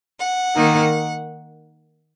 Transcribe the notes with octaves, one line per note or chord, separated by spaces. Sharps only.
F#5
D#3 A#3 D#4